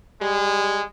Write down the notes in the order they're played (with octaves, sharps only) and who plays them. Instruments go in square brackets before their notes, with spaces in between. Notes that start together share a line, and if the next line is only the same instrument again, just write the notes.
[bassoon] G3 [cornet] G#3